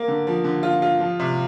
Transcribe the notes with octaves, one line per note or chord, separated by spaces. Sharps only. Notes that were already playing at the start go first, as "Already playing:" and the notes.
Already playing: A#3
D3
F3
D3
F4
F4
F3
C3